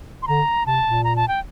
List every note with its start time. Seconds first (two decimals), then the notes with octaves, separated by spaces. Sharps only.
0.22 C6
0.27 D3 A#5
0.66 C3 A5
0.84 A#2
1.04 A#5
1.16 A5
1.28 G5